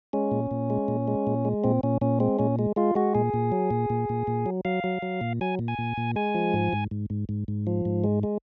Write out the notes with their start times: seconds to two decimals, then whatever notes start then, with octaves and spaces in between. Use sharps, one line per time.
0.13 G#3 C#4
0.31 A#2
0.51 A#2
0.70 G#3
0.88 A#2
1.08 G#3
1.27 A#2
1.45 G#3
1.64 A#2 C4
1.83 A#2 C#4
2.01 A#2 C#4
2.20 G#3 C4
2.39 A#2 C#4
2.59 G#3
2.76 G#3 F4
2.95 G#3 F#4
3.15 A#2 G#4
3.34 A#2
3.52 F#3
3.71 A#2
3.90 A#2
4.09 A#2
4.27 A#2
4.46 F#3
4.65 F#3 F5
4.84 F#3
5.02 F#3
5.21 A#2
5.41 F#3 G#5
5.59 A#2
5.68 G#5
5.78 A#2
5.97 A#2
6.16 G#3 G#5
6.35 F3
6.54 G#2
6.73 G#2
6.91 G#2
7.10 G#2
7.29 G#2
7.48 G#2
7.67 F3
7.85 G#2
8.04 G#3
8.23 G#3